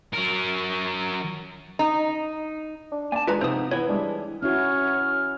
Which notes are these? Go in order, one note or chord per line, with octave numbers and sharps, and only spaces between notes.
F#3 A#4
D#4
D4
A#3 D5 G#5 A5
D3 D#3 G#3 F4 B4 A#5
C3 F3 B3 D#4 C5 D#6
E3 B3 E4 B4 C#5
G3 G#3 D4
C#4 E4 F#4 C#5 F6